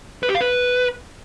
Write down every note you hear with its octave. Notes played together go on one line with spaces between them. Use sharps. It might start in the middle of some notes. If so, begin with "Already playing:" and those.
B4
G4
F5
B4